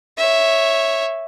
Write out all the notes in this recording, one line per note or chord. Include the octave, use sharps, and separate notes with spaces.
C#5 E5